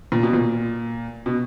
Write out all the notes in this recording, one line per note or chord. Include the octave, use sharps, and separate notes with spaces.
A#2
B2
A#2
B2